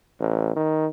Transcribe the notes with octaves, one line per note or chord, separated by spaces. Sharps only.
A1
D#3